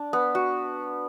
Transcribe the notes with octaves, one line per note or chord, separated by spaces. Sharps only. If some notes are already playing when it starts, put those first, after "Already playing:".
Already playing: D4
B3
F#4